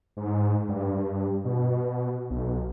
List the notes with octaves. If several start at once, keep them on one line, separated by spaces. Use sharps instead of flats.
G#2
G2
B2
B1